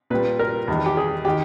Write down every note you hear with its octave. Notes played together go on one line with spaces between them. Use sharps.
A#2 G3 B4
A#4
E2 D#3 G3
G4
G#4
D#3 G4